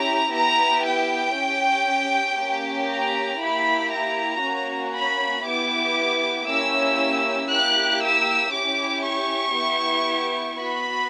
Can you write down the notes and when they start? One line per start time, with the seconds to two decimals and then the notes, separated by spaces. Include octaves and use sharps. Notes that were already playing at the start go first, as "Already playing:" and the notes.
Already playing: C#4 E4 G4 A#5
0.33 B3 E4 G4 A#5
0.83 G5
1.35 C#4 G4
2.38 A#3 C#4 G4
2.89 A#5
3.40 A#3 E4 G4 B5
3.92 A#5
4.42 A#3 C#4 F#4
4.94 B5
5.45 B3 E4 G4 D6
6.47 A#3 C#4 E4 G4 E6
7.50 A#3 E4 G4 F#6
8.02 E6
8.52 C#4 E4 G4 D6
9.04 C#6
9.55 B3 E4 G4
10.58 B3 F#4 B5